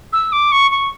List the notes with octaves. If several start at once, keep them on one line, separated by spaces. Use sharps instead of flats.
E6
D6
C#6
C#6